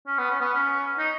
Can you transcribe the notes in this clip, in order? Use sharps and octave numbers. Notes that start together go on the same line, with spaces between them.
C#4
B3
C#4
B3
C#4
D#4